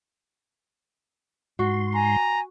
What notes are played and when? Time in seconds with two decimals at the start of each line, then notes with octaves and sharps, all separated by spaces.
1.59 G#2 F#4 C6
1.95 G#5 A#5